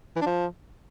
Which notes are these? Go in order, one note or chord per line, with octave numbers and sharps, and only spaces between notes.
E3
D4
F3